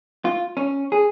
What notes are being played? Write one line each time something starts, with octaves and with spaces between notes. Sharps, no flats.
F4
C#4
G#4